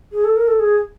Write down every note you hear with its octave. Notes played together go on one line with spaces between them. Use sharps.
G#4
A4
A#4
A4
G#4